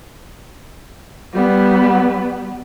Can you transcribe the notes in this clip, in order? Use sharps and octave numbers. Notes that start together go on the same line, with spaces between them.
G3 B3